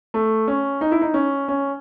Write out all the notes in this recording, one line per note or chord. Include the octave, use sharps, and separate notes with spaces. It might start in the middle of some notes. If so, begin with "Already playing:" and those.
A3
C#4
D#4
E4
D#4
C#4
C#4